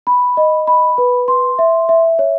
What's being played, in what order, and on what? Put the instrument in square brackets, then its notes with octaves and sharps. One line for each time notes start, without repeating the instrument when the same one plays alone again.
[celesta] B5
D#5
B5
B4
C6
E5
E5
C#5